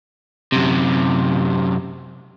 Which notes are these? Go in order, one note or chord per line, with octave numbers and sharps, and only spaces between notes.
F#2 C3